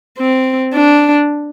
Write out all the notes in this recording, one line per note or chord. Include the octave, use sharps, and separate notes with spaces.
C4
D4